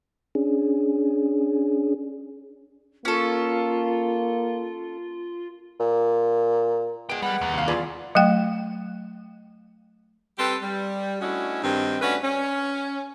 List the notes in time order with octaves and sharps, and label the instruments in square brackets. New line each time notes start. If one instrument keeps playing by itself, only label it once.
[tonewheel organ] C#4 D4 G#4
[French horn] A#3 [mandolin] C#4 A4 [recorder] F4
[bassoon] A#2
[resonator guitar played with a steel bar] G#3 B3 [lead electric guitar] B4 G5 [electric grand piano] D7
[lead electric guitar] G3 [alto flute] F#5
[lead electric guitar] D#2
[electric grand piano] C2 F5
[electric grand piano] E2 D5 [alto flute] F4 [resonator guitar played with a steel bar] G#4 B4
[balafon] F#3 A3 G5
[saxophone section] G3 C4 G4 A4 B4
G3
A3 C#4 D4 E4 F#4 D#5
G2 D#3 C4
A3 C#4 D4 F#4 B4
C#4